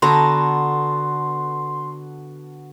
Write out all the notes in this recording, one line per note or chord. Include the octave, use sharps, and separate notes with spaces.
D3 B3 F#4 A4 A#5 C6